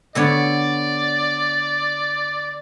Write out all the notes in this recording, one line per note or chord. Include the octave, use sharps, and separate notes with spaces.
D3 B3 C#5 D5